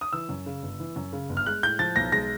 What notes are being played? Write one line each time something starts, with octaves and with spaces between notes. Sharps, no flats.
D#6
E3 E6
F#2
C#3
G1
E3
F#2
C#3
G1
F6
G#3 F#6
A2 G6
F3 A6
B1 A#6
G#3 A#6